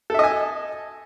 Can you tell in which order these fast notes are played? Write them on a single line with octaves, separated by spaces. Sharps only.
A4 E5 D#5 G#5